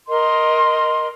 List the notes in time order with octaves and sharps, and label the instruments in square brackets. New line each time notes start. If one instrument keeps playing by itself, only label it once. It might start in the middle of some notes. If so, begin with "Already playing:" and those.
[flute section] A#4 D#5 C6